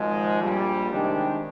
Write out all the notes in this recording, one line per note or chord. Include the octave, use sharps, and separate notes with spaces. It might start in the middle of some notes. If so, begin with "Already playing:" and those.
Already playing: G#1 G#2 F3 G#3
A#1 A#2 G3
C3 D#3 G#3 D4 G4